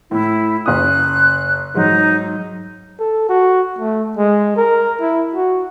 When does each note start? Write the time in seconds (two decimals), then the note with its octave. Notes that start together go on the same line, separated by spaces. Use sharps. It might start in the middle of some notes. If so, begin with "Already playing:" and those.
0.11 A2 E4
0.66 F#1 D#6 F#6
1.75 G#2 F#3 D#4
3.00 A4
3.29 F#4
3.79 A3
4.17 G#3
4.56 A#4
5.01 E4
5.35 F#4